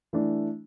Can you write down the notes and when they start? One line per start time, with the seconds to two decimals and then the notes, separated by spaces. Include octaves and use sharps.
0.13 E3 A3 D4